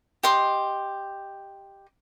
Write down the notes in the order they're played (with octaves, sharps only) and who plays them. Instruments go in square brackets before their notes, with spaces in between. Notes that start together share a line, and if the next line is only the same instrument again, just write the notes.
[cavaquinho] G4 D#5 C6